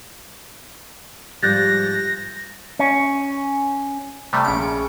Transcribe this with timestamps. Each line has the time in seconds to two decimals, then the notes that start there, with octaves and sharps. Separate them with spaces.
1.43 G#2 F3 G3 F#6 G6 A6 A#6
2.79 C#4
4.33 C3 G3 A3
4.45 A#1 C#3 C#4 D7